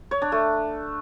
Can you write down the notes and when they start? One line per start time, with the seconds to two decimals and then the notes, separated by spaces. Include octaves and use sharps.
0.11 C#5
0.22 D4
0.32 A3